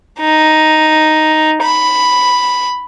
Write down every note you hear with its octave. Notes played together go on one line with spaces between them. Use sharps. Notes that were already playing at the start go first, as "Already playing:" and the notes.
D#4
B5